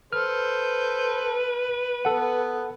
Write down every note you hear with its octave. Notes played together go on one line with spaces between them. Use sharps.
A4 B4 C5 F6
B3 A4 F#5